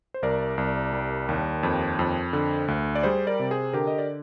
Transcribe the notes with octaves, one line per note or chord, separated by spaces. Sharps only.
C5
C2 A#4 D5
C2
G3
D#2
F2
F2
D3
D2
D5
G3 G#4 C5
A#4 D5
C3
G#4 C5
D3 G4 A#4
D#5
D5